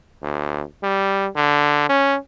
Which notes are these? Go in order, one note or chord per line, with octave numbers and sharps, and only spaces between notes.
D2
G3
D3
C#4